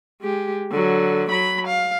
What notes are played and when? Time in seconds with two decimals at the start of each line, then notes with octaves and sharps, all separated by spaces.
0.22 G#3 G4
0.71 D3 F#3
1.30 F#3 B5
1.68 F5